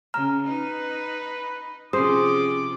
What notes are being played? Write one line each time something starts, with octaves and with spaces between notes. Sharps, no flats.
C#3 A#5 F6
D#4 B4
C3 F3 C#4 G#4 C5 D6 D#6